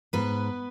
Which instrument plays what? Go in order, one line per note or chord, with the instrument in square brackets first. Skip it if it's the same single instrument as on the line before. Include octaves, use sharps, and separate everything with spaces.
[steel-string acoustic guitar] G#2 B3 B4